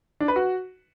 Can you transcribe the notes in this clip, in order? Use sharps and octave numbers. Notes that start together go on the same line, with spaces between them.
D4
B4
F#4